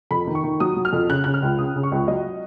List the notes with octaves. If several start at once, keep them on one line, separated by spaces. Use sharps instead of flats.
F2 B5
D#3
C#6
D#3
F#3 D#6
F#3
F6
F2
C#3 F#6
C#3 F#6
F6
C#2
C#3 D#6
C#3
C#6
C#2
F#3 D#5